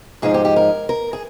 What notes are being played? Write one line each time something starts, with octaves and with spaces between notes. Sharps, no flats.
G#2 F3 G#3 D#4 G#4
G4
G4
A#4
A#4
G#4